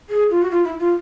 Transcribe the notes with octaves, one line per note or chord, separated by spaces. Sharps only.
G#4
F4
F#4
F4
E4
F4